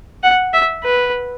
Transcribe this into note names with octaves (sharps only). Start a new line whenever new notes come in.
F#5
E5
B4